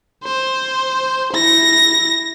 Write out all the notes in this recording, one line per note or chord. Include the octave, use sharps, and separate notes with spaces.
C5
E4 A#6